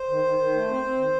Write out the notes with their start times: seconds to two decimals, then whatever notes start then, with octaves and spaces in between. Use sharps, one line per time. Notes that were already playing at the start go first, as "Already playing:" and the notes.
Already playing: C5
0.09 D#3
0.24 D#3
0.39 D#3
0.53 A3
0.68 C4
0.83 C4
0.97 D#3